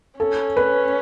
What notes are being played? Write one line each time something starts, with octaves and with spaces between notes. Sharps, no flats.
C#4 A4
B4